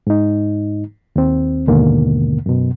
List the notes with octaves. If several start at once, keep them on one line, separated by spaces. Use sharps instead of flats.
G#2 D#4
D#2 C4
D#2 G#2 B2 D3 A#3
F#2 B2